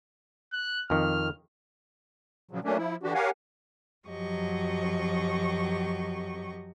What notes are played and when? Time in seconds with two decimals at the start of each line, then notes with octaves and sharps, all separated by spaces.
0.53 F#6
0.90 F2 D#3 F6
2.51 A#2 C#3 F3 F#3
2.64 F#3 A3 A#3 C#4 D4
2.77 F3 E4
3.03 D3 E3 D4 F#4 G4
3.14 G4 A#4 C#5 F5 F#5 G#5
4.07 F#2 F3 F#3 G4 D#5 C#6